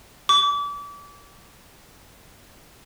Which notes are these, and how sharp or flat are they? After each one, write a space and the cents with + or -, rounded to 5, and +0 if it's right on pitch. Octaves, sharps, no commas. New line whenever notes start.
D6 -30